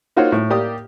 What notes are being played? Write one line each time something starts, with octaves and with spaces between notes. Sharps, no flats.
A#3 D#4 F4 F#4 C5 C#5
A2
A#3 G4 D5 D#6